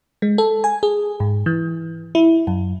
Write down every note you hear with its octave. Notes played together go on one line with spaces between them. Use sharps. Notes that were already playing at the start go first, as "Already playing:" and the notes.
G#3
A4
G#5
G#4
G#2
E3
E4
F#2